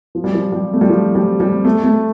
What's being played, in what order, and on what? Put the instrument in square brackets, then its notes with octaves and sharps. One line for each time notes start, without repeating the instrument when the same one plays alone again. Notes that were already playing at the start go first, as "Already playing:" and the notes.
[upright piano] F3
G3
F3
G3
A3
G3
F3
G3
G3
A3
A3